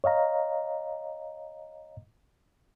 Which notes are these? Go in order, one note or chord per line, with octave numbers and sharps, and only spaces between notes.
C#5 D#5 F5 A#5